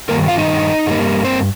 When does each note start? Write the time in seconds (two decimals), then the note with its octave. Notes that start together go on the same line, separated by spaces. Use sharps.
0.09 G2 D#3 A#3 A#4
0.28 F4 F5
0.38 D#4 D#5
0.86 G2 G3 A#3
1.24 C4 C5